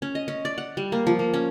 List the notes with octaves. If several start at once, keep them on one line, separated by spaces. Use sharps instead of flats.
C#4
D#5
C#4
D5
F#5
G3
A#3
F3
A#3
C#4